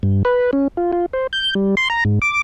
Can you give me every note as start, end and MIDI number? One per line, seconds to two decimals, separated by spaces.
0.03 0.23 43
0.25 0.51 71
0.53 0.68 61
0.77 0.92 65
0.93 1.06 65
1.13 1.27 72
1.33 1.54 91
1.55 1.75 55
1.77 1.88 84
1.90 2.04 82
2.05 2.19 44
2.22 2.41 86